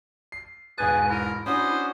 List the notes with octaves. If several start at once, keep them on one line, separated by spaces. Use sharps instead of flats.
C7
E1 G#2 G#4 B4 G#5 F#6 A6
E4 A#4
C#4 D4 F#4 C5 D#6